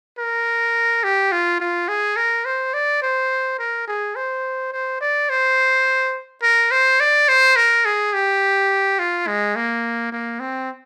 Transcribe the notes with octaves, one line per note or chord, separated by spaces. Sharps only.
A#4
G4
F4
F4
G#4
A#4
C5
D5
C5
A#4
G#4
C5
C5
D5
C5
A#4
C5
D5
C5
A#4
G#4
G4
F4
G#3
A#3
A#3
C4